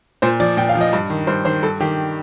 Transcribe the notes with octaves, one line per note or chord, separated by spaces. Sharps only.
A#2 C5
F3 D5
A#2 G5
F5
F3
D#5
G2
D#3
G2 C5
D#3 C5
G2 A4
D#3 G4